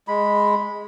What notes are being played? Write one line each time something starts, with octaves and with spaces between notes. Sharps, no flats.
G#3 B5